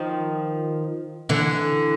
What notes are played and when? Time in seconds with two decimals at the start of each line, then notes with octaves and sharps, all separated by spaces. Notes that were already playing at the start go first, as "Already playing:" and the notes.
Already playing: D#3 F3
1.29 D3 E3